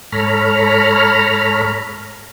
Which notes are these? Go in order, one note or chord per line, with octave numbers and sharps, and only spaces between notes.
G#2 A4 C#5 A#5 B5 F6